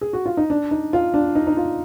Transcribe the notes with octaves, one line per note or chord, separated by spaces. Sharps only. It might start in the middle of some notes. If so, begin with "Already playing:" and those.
G#4
F#4
F4
D#4
D4
D#4
F4
D4
D#4
D#4
F4